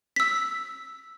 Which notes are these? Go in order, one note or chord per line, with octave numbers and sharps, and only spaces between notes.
E6 B6